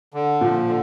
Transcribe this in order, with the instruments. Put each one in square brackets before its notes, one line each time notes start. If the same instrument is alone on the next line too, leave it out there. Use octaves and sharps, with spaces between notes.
[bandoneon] D3
[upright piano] A#2 [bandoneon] F3
[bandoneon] D3